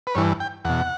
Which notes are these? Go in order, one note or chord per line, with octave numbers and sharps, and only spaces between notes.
B4
G2 E3 C#5
G5
E2 B2 F#5